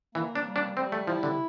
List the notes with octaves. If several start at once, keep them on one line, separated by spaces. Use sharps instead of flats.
E3 A#3
D4
G3
D4
G3 C4
A3
F3 E4
D3